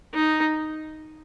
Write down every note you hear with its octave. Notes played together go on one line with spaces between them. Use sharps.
D#4